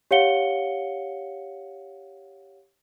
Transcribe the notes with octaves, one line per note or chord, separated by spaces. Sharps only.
G4 C#5 F5 F#5 C#7 G7